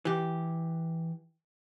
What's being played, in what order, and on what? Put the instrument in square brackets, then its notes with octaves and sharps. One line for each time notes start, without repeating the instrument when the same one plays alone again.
[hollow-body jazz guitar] E3 G4